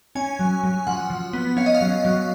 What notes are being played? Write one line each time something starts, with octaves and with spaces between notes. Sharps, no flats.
C#4 G#5
F#3
F#3
F3 F#5
F3
B3
C#4 F5
D#5
F5
F#3
F#3